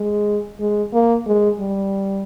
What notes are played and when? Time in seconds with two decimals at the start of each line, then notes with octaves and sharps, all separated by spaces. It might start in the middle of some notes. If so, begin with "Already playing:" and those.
Already playing: G#3
0.60 G#3
0.93 A#3
1.27 G#3
1.59 G3